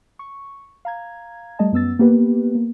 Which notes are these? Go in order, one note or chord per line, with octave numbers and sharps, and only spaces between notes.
C#6
F5 A#5 G#6
G3 A3 D#5 A5
F#2 B3 E6 A6
A#3 B3 G4 B4
A#3